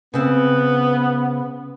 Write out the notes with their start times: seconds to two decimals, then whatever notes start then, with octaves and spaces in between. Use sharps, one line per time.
0.14 C#3 B3 C4